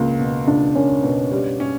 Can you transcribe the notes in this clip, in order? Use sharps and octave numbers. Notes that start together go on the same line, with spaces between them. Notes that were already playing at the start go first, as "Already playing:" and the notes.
Already playing: C#2 A#3
B2 B3
C#2 D4
A#3 C#4
B2 B3
G3
C#4